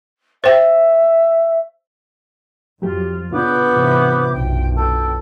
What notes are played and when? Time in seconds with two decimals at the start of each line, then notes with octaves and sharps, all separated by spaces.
0.44 C5 E5 G5
2.82 F2 F#3 F4 G4
3.32 C#3 B3 D4 F4 B4 D6 G6
3.71 G#2 C3 E3
4.32 B1 F#2 G5
4.77 A4 G5